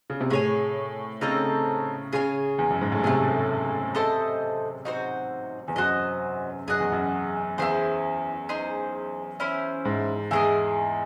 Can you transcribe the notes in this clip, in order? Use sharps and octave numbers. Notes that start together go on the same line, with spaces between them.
C#3
C3
A2 G#4 C#5 G#5
C#3 C4 D#4 A4
C#3 G#4 C#5 G#5
E2
F#2
G#2
A2
C3 A3 C#4 G#4
E4 A4 C5 D#5
D#4 F#4 C5
E2
F#2 F#4 C5 D#5
F#2 G#4 D#5 F#5
E2
F#2
E2 E4 G#4 C5
D#4 G#4 C5
C#4 E4 C5
G#2
E2 E4 G#4 D#5